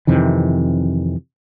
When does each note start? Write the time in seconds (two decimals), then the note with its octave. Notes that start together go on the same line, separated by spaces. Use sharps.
0.07 F2 C3 D#3 E3